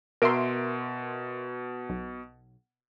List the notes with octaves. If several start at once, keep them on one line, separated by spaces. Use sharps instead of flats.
B2 A#4 E5 C6 D7
B1